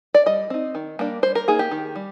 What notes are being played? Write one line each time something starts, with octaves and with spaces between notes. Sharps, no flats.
D5
G3 D#5
C4 D#4
D#3
G3 A#3 D4
G3 C5
A#4
A#3 D#4 G#4
G4
D#3
G3